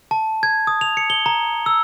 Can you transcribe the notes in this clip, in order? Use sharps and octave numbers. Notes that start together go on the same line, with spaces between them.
A5
G#6
D#6
F7
C#7
G7
A#5
E6